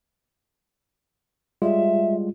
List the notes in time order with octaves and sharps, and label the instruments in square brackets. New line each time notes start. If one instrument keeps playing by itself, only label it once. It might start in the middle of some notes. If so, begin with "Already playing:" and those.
[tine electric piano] G3 G#3 F4 [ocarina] E5